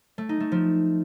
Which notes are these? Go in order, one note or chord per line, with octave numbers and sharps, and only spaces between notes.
A3
D#4
A3
F3